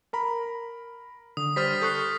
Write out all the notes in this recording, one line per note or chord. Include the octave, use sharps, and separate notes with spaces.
A#4 A#5 B5
D3 D#6
G3 C5 D#6 F6 A6 B6
A4 C#6 F#6 G6 C7